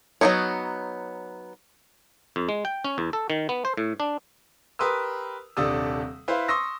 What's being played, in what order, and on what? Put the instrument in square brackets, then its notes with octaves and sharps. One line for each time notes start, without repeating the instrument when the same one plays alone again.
[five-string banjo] F#3 A#3 B3 D#4 C#5
[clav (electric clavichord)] F2
G#3
G5
C#4
E2
A4
D#3
B3
C5
A2
D4
[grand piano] G4 A#4 B4 C6 D#6 E6
D#1 C3 D4 A4 D#6 E6
E4 B4 C5 F5
C6 C#6 D#6 E6 A#6